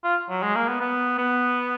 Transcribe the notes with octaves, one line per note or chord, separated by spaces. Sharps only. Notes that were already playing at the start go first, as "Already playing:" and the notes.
F4
F#3
G#3
A#3
B3
B3
B3